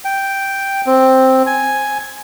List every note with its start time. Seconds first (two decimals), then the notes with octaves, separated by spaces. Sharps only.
0.05 G5
0.86 C4
1.46 G#5